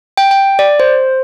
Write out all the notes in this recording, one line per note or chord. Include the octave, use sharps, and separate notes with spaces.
G5
G5
D5
C5